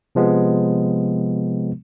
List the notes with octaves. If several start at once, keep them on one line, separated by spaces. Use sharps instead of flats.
C3 F3 G#3 B3